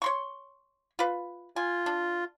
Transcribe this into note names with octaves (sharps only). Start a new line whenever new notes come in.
C#5 C6 C#6
F4 B4
F4 G#5
D4